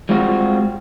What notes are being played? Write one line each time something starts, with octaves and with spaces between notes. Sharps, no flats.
G3 G#3 C4 F4 F#4